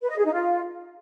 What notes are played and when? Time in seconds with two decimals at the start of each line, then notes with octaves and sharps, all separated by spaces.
0.02 B4
0.10 D#5
0.17 G#4
0.25 D#4
0.33 F4